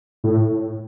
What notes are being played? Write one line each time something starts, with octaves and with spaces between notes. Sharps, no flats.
A2